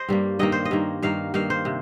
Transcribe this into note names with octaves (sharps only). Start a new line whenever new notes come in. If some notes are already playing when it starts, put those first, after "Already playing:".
Already playing: C5 D#5
G2 G3 A#3
G2 D#3 A#3 D#5
C5
D#5
G2 D#3 A#3
G2 D#3 A#3 F5
G2 D#3 A#3 F5
C5
C3